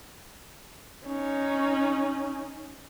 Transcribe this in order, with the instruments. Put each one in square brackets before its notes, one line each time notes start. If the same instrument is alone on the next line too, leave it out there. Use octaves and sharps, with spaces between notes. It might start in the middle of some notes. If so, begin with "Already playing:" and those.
[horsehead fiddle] C#4 D#4